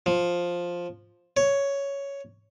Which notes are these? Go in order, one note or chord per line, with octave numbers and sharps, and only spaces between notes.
F3
C#5